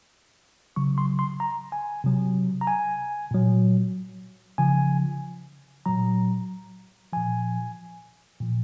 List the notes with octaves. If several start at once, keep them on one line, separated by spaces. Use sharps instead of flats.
C#3 F#3 C#6
C6
C6
A#5
G#5
C3 F#3
A#5
G#5
A#2 F#3
C#3 F3 G#5
A#2 F#3 A#5
A#2 F3 G#5
A#2 F3